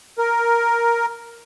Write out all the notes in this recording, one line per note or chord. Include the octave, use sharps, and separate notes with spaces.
A#4